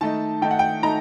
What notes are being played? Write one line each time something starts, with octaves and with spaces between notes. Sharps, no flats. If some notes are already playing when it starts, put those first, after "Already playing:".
D#3 A3 D#4 A5
D#3 A3 D#4 G5
F#5
G5
D#3 A3 D#4 A#5